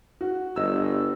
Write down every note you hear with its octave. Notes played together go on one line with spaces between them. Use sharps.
F#4
G1 D#5 E6